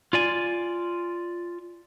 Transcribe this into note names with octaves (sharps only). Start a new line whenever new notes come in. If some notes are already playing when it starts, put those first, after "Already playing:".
F4 D5 G#5